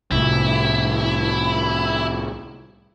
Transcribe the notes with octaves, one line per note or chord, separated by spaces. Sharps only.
C2 A2 E4